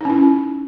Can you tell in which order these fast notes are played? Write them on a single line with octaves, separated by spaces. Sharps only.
D#4 C#4 E4